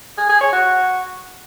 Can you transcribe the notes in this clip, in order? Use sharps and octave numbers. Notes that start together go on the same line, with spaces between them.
G#4
G#4
C#5
F#4